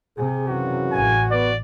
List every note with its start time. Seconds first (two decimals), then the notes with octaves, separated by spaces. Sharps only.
0.17 C3 G#4
0.48 F#2 C#3 E3 F#4
0.92 A1 G#5
1.31 B3 D5